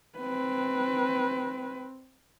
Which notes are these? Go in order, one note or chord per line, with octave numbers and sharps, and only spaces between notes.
C4 B4